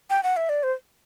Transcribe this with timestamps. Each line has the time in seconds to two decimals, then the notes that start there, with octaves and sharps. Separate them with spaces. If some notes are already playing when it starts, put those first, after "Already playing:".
0.10 G5
0.23 F#5
0.37 E5
0.49 D5
0.63 C5